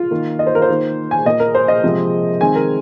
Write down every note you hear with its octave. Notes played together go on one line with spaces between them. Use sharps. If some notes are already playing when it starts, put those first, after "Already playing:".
Already playing: F4
D#3 A#3
D#5
C5
A#4
C5
D#3 A#3
G#5
A#2 A#3 D#5
A#4
C5
D#5
C3 F3 G#3 C4
D#3 G#3 C4 G#5
A#4